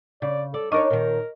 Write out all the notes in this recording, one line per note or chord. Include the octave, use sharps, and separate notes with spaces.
C#3 D5
A4 D5
D4 D#4 A#4 C#5 D#5 C#6 D6
A#2 D#3 A#4